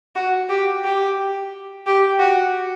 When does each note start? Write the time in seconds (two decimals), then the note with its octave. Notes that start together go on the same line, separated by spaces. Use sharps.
0.16 F#4
0.49 G4
0.85 G4
1.86 G4
2.19 F#4